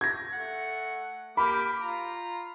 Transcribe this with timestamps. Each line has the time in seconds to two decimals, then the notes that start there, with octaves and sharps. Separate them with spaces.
0.01 G#6 A#6
0.33 A3 F#5
1.37 A#3 G4 B5 D6
1.81 F4 A#5